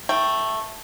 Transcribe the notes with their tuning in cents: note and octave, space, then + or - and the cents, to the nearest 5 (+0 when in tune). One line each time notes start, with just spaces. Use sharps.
E3 -45 A3 +0 G5 +0